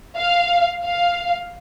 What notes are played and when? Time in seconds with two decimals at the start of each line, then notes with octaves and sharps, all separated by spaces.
0.17 F5
0.84 F5